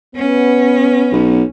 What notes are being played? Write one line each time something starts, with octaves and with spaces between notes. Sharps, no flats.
B3 C#4
B1